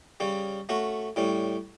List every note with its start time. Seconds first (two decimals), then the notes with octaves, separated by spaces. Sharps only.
0.20 C#3 G3 C#4
0.69 A3 C#4 F#4
1.16 A2 G3 C#4